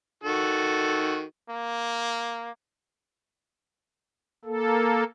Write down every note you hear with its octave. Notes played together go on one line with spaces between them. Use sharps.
D#3 F#4 A4
A#3
A#3 A4